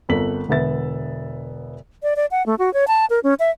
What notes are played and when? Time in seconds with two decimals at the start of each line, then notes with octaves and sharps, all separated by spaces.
0.09 G1 C4 A4 A#4 B6 F#7
0.48 E1 D3 B3 E5 A6
2.03 D5
2.16 D5
2.31 F#5
2.46 A3
2.59 F#4
2.74 C#5
2.88 A5
3.10 A#4
3.24 C#4
3.40 E5